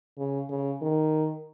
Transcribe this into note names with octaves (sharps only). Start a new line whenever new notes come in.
C#3
C#3
D#3